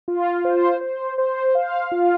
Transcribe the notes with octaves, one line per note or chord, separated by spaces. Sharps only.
F4
C5
C5
C5
F5
F4